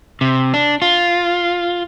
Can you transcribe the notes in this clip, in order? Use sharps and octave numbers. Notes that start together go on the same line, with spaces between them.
C3
D4
F4